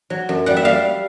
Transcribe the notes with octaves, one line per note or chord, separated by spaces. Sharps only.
F#3
F#2
G3 F#5
E5
G3 F5